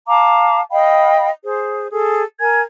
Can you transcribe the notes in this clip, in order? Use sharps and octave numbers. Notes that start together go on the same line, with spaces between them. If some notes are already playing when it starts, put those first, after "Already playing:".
F5 A5 A#5 D6
D#5 F5 G5 B5
G#4 C5
G#4 A4
A#4 G#5 G#6